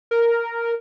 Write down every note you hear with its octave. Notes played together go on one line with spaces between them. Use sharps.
A#4